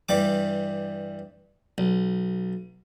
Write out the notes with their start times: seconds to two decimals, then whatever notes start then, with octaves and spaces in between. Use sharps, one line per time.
0.09 G2 E3 G3 D6
1.78 B1